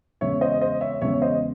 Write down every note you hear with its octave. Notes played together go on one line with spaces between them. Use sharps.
E2 C#3 G#3 C#5 E5
C5 D#5
C5 D#5
C#5 E5
E2 C#3 G#3 C#5 E5
C5 D#5